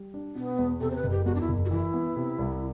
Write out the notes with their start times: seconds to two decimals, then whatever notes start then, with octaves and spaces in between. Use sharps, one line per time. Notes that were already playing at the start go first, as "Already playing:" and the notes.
Already playing: G3
0.14 D4
0.35 B2 B3
0.58 E2
0.80 C3 A4
0.91 C5
0.96 B4
1.04 F#1
1.11 G4
1.26 E2 F#4
1.35 D4
1.41 E4
1.49 F#1
1.65 F#4
1.71 E3 E4
1.94 B3
2.16 C3
2.38 C2